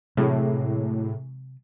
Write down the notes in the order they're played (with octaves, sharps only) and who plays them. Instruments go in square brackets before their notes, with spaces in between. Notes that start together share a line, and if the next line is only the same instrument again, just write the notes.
[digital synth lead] A2 [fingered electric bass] C3 [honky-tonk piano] E3 F#3 G#3